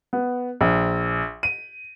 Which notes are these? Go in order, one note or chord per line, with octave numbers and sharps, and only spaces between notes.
B3
A#1
D#7